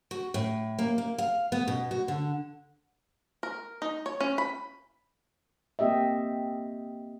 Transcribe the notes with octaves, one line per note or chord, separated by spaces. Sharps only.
F#4
A2
A#3
A#3
F5
B3
B2
F#4
D3
A#4
D#4
C#5
C#4
B5
A#3 C4 G4 D#5 E5